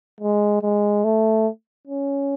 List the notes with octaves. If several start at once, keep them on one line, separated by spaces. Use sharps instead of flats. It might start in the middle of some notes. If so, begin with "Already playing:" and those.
G#3
G#3
A3
C#4